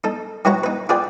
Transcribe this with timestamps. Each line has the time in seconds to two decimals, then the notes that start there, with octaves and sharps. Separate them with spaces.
0.04 D#4 A4
0.45 D#3 F#3 E4 F#4 B4 A#5
0.64 D#4 B4
0.89 F4 G#4 B4 D5 G5